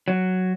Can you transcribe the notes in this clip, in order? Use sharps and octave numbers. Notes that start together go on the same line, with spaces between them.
F#3